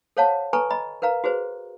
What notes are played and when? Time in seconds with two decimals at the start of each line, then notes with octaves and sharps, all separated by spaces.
0.17 A4 C5 C#5 F5 F#5 A5
0.53 A4 B4 G#5 A#5 C#6
0.70 D#5 A#5 B5
1.02 A#4 B4 F5 A#5
1.24 F#4 G#4 B4 C5